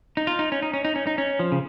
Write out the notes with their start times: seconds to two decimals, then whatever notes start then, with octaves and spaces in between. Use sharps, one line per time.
0.17 D#4
0.27 F4
0.39 D#4
0.52 C#4
0.62 D#4
0.74 C#4
0.85 D#4
0.96 C#4
1.07 D#4
1.18 C#4
1.39 F3
1.52 C#3